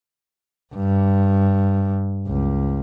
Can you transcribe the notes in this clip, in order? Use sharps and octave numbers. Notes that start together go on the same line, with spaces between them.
G2
C#2